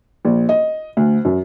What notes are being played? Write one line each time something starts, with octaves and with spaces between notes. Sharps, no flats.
A#1
D#5
D2
F#2